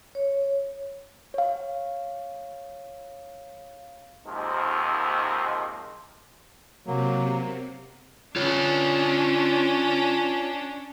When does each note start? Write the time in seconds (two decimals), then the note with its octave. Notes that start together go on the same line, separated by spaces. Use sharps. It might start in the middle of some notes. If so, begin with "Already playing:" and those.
0.15 C#5
1.34 C#5 F5
4.26 D#2 G#2 C3 D#3 F3
6.87 C3 F#3 A#3
8.36 C#4 D4 F4 C#5